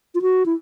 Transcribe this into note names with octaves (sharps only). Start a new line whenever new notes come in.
F4
F#4
E4